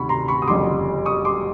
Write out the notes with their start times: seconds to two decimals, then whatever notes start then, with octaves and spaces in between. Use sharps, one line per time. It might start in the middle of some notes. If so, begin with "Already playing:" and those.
Already playing: D2 C3 D#3 B5 C#6
0.09 A#5 C6
0.28 B5 C#6
0.42 D#6
0.48 F#1 F2 D3 G3 C6 D6
1.06 C#6 D#6
1.25 C6 D6